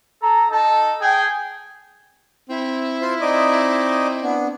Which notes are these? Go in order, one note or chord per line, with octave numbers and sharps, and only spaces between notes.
A4 A#5
D#4 A4 A5
G#4 G5
C4 E4
F4 C5 C6
C4 D#4 D5 D#5
B3 D4